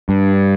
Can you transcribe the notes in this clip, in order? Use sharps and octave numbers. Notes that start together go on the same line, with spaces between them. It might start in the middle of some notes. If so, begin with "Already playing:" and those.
G2